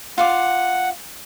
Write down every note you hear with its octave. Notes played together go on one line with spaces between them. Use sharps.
F4 F5 F#5 D6